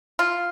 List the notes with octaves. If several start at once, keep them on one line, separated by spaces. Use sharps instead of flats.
F4